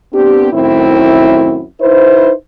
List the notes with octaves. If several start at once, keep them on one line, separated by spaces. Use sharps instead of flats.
B3 C4 D4 G4
F#2 A2 D#3 C4 E4
D#4 E4 B4 C5